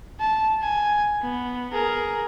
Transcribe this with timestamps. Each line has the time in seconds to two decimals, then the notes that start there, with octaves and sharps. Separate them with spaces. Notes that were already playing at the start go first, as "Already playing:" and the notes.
0.20 A5
0.62 G#5
1.21 B3
1.72 G#4 A#4